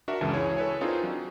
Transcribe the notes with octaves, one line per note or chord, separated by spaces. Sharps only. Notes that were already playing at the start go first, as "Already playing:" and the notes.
D4 F#4 A#4 E5
C#2 F#2 E3 C#4 G#4 A5
E4 G#4 C#5
A4 B4 C#5 G#5
C4 D4 D#4 F4 G#4 A#4
F#3